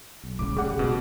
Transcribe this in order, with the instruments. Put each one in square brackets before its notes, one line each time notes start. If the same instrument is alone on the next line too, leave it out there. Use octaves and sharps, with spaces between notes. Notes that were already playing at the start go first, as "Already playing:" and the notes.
[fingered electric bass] B1
[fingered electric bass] F1 A2 C#3 [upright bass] F#3 G3 [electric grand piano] D6
[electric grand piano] G3 F#5 [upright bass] A3 [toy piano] G#4
[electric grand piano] B2 [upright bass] B3 C4